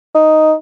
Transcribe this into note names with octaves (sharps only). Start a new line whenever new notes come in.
D#4